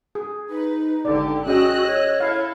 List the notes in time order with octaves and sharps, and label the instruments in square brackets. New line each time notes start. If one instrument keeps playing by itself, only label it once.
[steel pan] G#4
[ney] D#4 [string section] B4
[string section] G#1 D3 G4 [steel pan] D5
[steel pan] C#4 G#4 G5 [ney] F#4 [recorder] D#5 [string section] E6 F#6
[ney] C#5
[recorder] E4 [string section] A4 [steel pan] F5